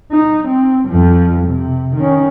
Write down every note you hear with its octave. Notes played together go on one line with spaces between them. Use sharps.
D#4
C4
F2 F3
C3
D#3 C#4